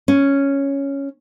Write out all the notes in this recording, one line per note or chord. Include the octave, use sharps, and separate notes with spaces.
C#4